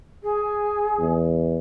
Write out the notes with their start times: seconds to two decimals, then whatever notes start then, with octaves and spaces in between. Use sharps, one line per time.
0.23 G#4
0.99 E2